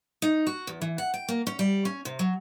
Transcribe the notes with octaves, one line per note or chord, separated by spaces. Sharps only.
D#4
F#4
E2
E3
F#5
G5
A#3
C#4
G3
C#4
C3
F#3